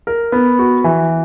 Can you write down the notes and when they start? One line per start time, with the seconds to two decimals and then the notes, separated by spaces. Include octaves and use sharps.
0.07 A#4
0.32 B3
0.59 F#4
0.84 E3